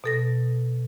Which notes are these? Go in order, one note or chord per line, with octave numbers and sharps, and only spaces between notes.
B2 A4 A#6